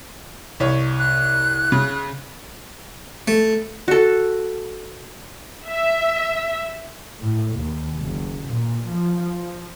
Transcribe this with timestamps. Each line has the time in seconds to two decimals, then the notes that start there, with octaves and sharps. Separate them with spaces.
0.60 C2 C#5
0.99 F#6
1.72 C#3
3.28 A3
3.88 F#4 A4
5.68 E5
7.20 A2
7.56 D#2
7.97 F#1
8.48 A#2
8.89 F3